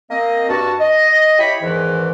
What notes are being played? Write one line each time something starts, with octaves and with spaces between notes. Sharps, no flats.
A#3 C4 D#5
G2 F#4 A5
D#5
E4 G4 C#5 B5
E2 G#2 D#3 E3